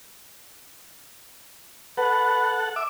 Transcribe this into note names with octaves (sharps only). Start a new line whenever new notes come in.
A4 B4 F#5
E5 D6